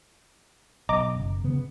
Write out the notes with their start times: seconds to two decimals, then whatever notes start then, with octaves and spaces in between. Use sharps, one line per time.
0.89 B1 D#5 A#5 D6
1.15 F#1
1.44 C#3 B3